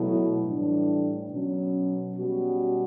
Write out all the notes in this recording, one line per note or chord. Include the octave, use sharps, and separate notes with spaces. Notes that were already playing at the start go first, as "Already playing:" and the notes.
Already playing: B2 F#3 A3 E4
A2 E3 G3 D4
B2 F#3 C#4
B2 G3 C#4 F#4